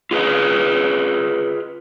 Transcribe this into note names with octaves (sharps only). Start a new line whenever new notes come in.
F4 G#4 B4 D#5